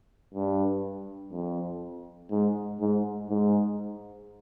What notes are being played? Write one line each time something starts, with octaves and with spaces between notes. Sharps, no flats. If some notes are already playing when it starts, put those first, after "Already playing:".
G2
F2
G#2
G#2
G#2